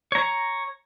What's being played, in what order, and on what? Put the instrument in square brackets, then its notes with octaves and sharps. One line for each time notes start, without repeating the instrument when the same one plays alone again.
[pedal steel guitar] C#5 A#5